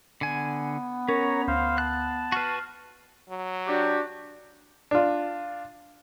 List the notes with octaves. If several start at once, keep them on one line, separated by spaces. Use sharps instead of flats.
D3 B3 G#5
C#4 A#4 C#5 A#5
D2 C5 F5
A5 F#6
F#4 B4 F6 F#6 C7
F#3
D4 F#4 G4
D4 F4